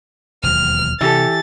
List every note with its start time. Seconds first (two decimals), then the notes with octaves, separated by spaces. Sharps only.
0.43 E1 D#2 F#3 F6
1.01 C3 E3 G4 A4 A6